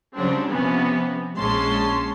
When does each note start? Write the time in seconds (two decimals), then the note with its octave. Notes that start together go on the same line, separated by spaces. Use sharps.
0.18 C#3 F#3 G3 C4 D4
0.50 C3 F3 B3 C#4
1.37 A#1 G#3 C#4 A5 C6